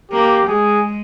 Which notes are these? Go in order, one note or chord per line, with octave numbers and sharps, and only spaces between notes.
A#3 G4
G#3 G#4